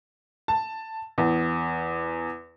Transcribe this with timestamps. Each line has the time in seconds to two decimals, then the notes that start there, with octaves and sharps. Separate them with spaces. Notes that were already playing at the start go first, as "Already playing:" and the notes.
0.48 A5
1.18 E2